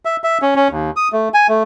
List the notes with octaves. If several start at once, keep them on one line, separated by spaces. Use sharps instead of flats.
E5
E5
C#4
C#4
D#2
D#6
A3
G#5
A3